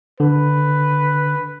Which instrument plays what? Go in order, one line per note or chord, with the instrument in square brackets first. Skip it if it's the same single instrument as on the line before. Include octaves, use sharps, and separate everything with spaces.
[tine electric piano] D3 [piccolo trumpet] B4